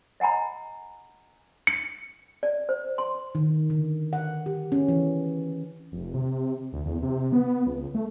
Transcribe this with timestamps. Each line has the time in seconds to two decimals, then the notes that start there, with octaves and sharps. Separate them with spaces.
0.20 D#5 F#5 G#5 A#5 B5
1.67 C#7
2.43 D5
2.69 C5
2.98 C6
3.35 D#3
3.70 D3
4.13 F#5
4.46 G4
4.72 C#4
4.88 E3
5.92 F1
6.14 C3
6.72 D2
6.85 E2
7.02 C3
7.32 B3
7.66 C#2
7.94 A3